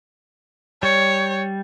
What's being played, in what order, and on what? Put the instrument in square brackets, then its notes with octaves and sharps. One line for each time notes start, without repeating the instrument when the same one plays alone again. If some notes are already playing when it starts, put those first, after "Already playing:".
[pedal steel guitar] G3 [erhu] C#5